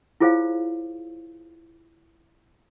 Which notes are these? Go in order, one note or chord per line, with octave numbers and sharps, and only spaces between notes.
E4 F4 G#4 C5 C#5 F5